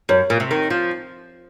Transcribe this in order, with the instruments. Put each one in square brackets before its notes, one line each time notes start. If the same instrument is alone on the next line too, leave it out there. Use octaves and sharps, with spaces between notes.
[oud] F#2 [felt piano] C#5
[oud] A#2
C3
D#3
F3